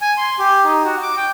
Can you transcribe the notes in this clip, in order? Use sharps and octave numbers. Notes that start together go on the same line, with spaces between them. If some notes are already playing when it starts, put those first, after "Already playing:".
G#5
C6
G4
D#4
F#4
D6
G5